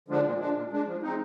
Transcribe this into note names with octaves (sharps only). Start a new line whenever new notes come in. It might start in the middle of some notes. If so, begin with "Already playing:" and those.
D3 F3 G#3 D4
A#2
G#3 D4
A#2
G#3 D4
F3
G#3 C4 D#4